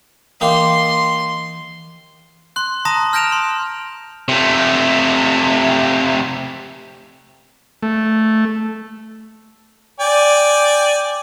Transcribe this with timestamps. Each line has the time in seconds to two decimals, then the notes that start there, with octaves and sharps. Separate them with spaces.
0.41 E3 A#3 D#4 G4 C6
2.56 C6 F#6
2.85 A5 A#5 C6 D#6 A#6
3.13 F6 G6 A#6 D7 E7 F7
3.32 C6
4.28 C3 A3
7.83 A3
10.00 D5 G5 G#5